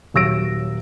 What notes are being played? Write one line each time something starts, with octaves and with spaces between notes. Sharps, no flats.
D#1 F#3 E6 A#6 D7